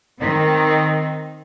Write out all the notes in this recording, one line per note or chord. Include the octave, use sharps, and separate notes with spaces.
D#3 C4 D#4